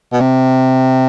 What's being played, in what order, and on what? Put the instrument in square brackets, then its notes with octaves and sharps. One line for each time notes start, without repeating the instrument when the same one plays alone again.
[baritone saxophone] B2
C3